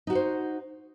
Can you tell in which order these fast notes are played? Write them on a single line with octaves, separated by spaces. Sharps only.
D#4 F#4 F#5 C5